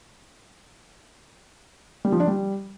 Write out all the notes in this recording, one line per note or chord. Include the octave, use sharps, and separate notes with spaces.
G3
F3
D4
G3